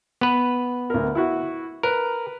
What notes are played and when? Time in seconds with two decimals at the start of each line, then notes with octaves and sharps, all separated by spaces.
0.21 B3 B4
0.90 D2 A#4
1.15 E4 F#4
1.83 A#4 B4